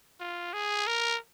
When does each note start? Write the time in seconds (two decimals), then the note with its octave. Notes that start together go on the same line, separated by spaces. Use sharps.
0.20 F4
0.53 G#4
0.87 A#4